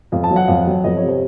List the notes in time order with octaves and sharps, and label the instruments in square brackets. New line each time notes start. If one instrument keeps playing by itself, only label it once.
[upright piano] F2 F5
A5
F#3
F#5
F2 F5
F#3
F2 D#5
C3 C#5
C5